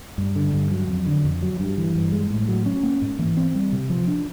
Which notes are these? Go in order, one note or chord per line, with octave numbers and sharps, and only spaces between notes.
G2
D3
G2
F#3
F2
D3
F2
F#3
G2
E3
G2
G#3
A2
F#3
C#4
A#3
G#2
E3
C4
G3
C3
F3
D4